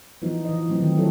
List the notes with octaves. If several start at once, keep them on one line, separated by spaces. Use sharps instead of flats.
E3 F3 B3 D#4
E3 D#5
F3 F#3 A3 C4
D#3 F3
F3 F#3 E4 G4 A4 C#5